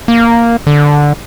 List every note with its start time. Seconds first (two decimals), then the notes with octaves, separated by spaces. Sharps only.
0.08 A#3
0.67 D3